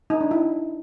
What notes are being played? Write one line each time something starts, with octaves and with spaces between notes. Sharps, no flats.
D#4
D4
E4